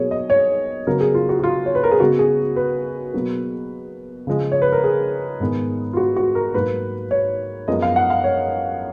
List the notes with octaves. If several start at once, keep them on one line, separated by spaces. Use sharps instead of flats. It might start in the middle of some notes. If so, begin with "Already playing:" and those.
Already playing: B2 F#3 A#3 G#4 C#5
D#5
C#5
C#3 F#3 B3 A#4
G#4
F4
F#4
F#4
F4
C#5
B4
A#4
G#4
C#3 G#3 B3 F#4
G#4
B4
B2 F#3 A#3
C#3 F3 G#3
C#5
B4
A#4
G#4
G#2 D#3 G#3 B3
F4
F#4
F#4
A#4
G#2 F#3 A#3 B4
C#5
F#2 F3 G#3 B3 D#5
F5
F#5
F5
C#5